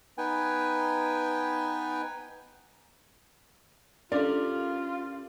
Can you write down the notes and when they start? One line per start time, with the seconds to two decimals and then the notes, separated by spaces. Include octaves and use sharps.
0.18 B3 D#4 B4 G5 G#5
4.12 C#4 D4 F4 G4 A4 A#4 D5